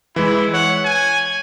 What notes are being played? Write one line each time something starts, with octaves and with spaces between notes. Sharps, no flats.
E3 G#3 E4
C#5 F#5
G#5